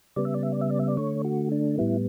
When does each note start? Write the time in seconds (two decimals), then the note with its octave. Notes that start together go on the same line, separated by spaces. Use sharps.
0.16 C#3 G3 B3 D5
0.25 E5
0.34 D5
0.43 E5
0.52 D5
0.61 E5
0.70 D5
0.79 E5
0.88 D5
0.97 D3 A3 C#5
1.24 F#4
1.52 D4
1.78 A2 G3 B3 E4